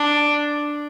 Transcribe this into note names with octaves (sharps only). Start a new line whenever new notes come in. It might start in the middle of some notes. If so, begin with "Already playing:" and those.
Already playing: D4